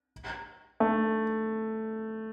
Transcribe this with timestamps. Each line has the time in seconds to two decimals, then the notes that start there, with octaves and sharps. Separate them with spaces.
0.80 A3